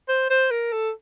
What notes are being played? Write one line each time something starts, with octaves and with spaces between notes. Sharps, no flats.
C5
C5
A#4
A4